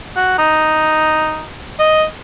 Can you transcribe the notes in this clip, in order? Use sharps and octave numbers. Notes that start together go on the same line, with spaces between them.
F#4
D#4
D#5